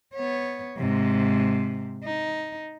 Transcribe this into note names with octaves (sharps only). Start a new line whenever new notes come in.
B3 C#5
G#2 C3
D#4